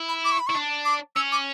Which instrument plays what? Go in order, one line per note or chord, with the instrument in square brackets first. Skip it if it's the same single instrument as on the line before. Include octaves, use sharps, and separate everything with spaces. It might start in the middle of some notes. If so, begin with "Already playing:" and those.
Already playing: [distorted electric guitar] E4
[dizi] B5
D6
C#6
B5
[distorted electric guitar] E4 [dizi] C#6
[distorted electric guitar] D4
[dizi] D6
[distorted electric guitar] C#4 [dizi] E6
[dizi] D6